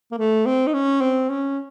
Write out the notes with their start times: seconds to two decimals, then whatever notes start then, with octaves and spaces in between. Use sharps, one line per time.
0.11 A#3
0.18 A3
0.46 C4
0.67 D#4
0.73 C#4
1.01 C4
1.29 C#4